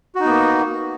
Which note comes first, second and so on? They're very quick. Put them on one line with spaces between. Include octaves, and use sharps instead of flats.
F#4 D#4 B3 A#3